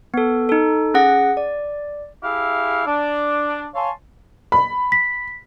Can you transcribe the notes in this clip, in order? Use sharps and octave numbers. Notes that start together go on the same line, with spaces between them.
B3 A4
D#4 A4
C#4 G#4 F#5 A#6
D5
E4 G4 G#4 E5 F5
D4
C#5 F5 G#5 A5 C6
B5
B6